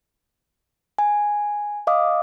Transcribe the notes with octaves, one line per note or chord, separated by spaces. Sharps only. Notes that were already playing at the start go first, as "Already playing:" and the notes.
G#5
D#5 F5 D6 D#6